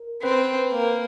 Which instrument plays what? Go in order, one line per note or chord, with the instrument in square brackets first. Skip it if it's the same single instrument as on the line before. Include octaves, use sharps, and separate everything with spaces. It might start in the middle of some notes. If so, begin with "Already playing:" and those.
Already playing: [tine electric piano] A#4
[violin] C4 [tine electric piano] B4
[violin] A#3